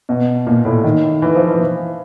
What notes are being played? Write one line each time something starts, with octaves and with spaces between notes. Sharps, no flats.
B2
A#2
A2
D#3
E3
F3
E3